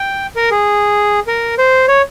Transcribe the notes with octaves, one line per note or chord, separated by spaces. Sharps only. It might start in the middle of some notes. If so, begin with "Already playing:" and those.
Already playing: G5
A#4
G#4
A#4
C5
C#5